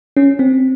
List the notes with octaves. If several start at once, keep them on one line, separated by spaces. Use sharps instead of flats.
C#4
C4